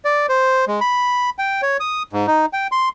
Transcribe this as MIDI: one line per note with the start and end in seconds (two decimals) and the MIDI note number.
0.05 0.26 74
0.29 0.65 72
0.67 0.80 56
0.81 1.30 83
1.39 1.61 79
1.62 1.77 73
1.80 2.03 87
2.13 2.26 44
2.27 2.46 63
2.53 2.67 79
2.72 2.89 84